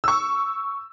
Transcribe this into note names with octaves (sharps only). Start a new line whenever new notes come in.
C#6 E6